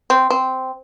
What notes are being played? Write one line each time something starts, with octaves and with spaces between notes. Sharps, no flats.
C4
C4